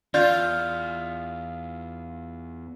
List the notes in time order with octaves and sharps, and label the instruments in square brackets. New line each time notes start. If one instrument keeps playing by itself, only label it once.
[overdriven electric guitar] E2 [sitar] F4 [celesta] D5 G6